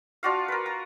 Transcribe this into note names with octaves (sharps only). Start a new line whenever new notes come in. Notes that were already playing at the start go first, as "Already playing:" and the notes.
D4 F4 F#4 F5
A#4 B4
A#5